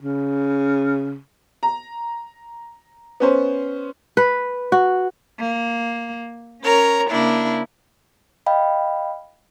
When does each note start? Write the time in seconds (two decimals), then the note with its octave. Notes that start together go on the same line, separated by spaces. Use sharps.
0.01 C#3
1.63 A#5
3.20 B3 C#4 C5
4.17 B4
4.72 F#4
5.37 A#3
6.62 C#4 A#4 C#5 A#5
7.09 C#3 A#3 D4 E4
8.46 D#5 F5 G5 B5